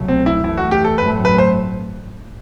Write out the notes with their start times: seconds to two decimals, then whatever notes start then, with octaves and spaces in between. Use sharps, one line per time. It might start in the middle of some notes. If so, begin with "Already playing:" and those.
Already playing: C2 B2 F#3 A3
0.08 C4
0.26 E4
0.44 F#2 E3 A3 E4
0.57 F#4
0.71 G4
0.84 A4
0.98 A1 G2 F#3 A3 C4 B4
1.25 B4
1.38 C5